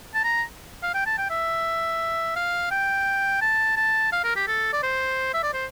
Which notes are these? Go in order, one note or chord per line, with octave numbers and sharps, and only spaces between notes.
A5
A#5
F5
G5
A5
G5
E5
F5
G5
A5
A5
F5
A#4
G4
A4
D5
C5
E5
D5
C5